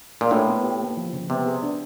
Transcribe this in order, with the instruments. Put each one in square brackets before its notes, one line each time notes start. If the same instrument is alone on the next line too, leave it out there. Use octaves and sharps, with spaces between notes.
[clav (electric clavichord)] A#2
[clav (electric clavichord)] A2 [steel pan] D4
[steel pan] B3
G4
A#3
F3
C#3
[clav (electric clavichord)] C3 [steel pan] B3
[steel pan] G#4
D4